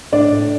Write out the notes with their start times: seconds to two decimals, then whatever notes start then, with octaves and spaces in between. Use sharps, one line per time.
0.12 A2 D4 D5
0.32 A2